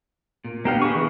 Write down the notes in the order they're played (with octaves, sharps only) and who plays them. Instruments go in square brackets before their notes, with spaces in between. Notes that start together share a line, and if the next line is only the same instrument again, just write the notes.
[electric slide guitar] A#2
[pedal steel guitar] A#3 G4 F5 [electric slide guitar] B3 D4
[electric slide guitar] G#4 [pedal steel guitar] B4 C#6
[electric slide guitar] E3